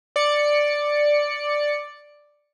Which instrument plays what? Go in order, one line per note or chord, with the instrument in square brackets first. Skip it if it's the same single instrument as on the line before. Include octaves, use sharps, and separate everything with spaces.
[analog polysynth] D5 C#7